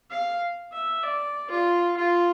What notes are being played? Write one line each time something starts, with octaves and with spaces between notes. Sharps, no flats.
F5
E5
D5
F4
F4